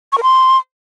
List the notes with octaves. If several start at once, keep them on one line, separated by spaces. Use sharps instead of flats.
C#6
A#4
C6